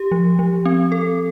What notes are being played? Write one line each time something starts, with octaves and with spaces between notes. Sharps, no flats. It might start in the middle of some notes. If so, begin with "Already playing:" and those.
Already playing: G4
F3
F3
C4
A4